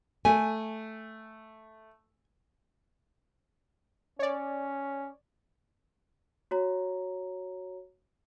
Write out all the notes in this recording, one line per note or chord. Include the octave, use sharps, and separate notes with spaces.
A3 G#5
C#4 C#5 D5
F#4 C#5 A#5